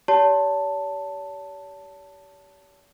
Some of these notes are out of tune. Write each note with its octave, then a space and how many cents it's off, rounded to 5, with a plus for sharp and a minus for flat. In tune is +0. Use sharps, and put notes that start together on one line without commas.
G4 -15 C#5 +45 A5 +10